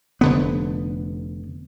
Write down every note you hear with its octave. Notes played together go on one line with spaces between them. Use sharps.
F1 D3 B3